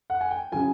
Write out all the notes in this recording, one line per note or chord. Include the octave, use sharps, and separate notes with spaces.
F#5
G#5
G5
C#3 F#3 G#5